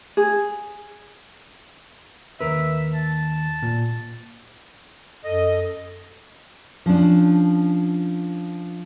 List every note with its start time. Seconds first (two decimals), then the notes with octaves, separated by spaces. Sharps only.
0.17 G#4
2.41 D#2 A#4 B4 E5
2.94 A5
3.62 A#2
5.24 F#2 A4 D#5
6.86 F3 C#4 D4